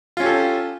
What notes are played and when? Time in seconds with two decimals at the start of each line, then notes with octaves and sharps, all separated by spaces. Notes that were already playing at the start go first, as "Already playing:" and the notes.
0.17 F4
0.20 C#4
0.23 G4
0.26 A4